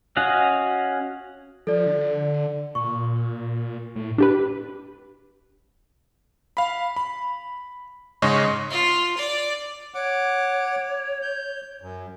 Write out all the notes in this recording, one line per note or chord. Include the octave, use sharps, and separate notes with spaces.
C#4 F#4 D#5 F5 F#5
F3 A4 D5
D3
A#2 C#6
A2
D4 G4 B4
F5 B5
B5
G#2 C#3 C#4 D#5 C#6
F4
D5
C#5 F#5 D6
G6
F#2